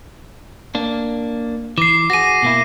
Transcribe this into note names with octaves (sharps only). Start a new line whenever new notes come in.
A#3 D4
E3 D6 C7
F#4 G#4 A#6 D#7
B2 A#3 E4